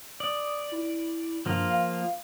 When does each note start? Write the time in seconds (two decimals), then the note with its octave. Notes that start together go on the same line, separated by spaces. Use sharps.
0.20 D5 D#6
0.72 E4
1.46 G2 F3 A#3 F4
1.70 F5